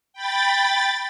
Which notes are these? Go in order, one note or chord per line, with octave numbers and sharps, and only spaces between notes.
G5 B5 A6